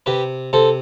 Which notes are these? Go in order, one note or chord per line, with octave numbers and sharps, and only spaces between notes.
C3 G4 B4
C3 A4 C5